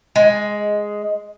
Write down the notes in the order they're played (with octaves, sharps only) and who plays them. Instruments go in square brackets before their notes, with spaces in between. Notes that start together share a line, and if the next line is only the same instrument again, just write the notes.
[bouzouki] G#3